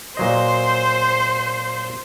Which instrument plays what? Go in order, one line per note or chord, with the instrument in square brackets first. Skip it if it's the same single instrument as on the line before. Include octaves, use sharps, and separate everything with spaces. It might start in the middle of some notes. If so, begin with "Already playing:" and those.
[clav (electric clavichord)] A#2 F#3 D#5 [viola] C5